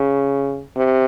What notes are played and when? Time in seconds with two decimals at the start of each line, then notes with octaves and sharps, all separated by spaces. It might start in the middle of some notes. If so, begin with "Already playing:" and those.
Already playing: C#3
0.76 C3